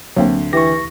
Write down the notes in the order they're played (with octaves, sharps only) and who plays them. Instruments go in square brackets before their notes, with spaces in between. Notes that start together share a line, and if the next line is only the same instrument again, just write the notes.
[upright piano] D2 [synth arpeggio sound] F#3 A#3 C4
[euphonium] E3 [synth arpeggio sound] G4 [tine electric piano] C#6 A#6